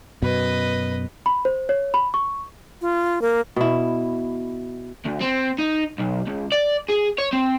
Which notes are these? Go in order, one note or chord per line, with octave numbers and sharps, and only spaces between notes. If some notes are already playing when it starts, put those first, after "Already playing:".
F#2 B2 B4 D#5
B5
C5
C#5
B5
C#6
F4
A#3
B2 E4
D2
C4
D#4
B1
C#2
D5
G#4
C#5
C4